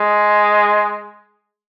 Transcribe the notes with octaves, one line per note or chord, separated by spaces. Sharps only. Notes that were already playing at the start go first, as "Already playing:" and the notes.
Already playing: G#3